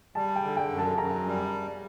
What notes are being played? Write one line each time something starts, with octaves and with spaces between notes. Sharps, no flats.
G3 A5
G5
D3
G5
F#2
A5
F#2 A#5
G3